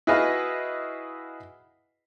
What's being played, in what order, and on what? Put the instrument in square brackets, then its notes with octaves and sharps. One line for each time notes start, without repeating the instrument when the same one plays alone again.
[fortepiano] E4 F#4 G#4 B4 D#5 F5